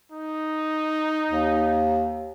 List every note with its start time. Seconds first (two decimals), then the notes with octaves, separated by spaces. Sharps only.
0.12 D#4
1.28 D#2